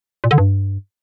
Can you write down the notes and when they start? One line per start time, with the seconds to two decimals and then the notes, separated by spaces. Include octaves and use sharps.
0.24 A#2
0.31 D3
0.38 G2